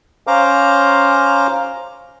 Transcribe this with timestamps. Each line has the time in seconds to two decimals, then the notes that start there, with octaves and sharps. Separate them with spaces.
0.27 C#4 C5 F5 A#5 D6